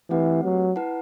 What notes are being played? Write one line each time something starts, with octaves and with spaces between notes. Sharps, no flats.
E3 A3 C4 G4 B4 F#5
F#3
E4 B4 F#5 A5